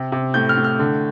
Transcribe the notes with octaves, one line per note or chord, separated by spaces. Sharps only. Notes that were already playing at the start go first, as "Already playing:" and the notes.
Already playing: C3
C3
A2 G6
F6
A2
F6
D3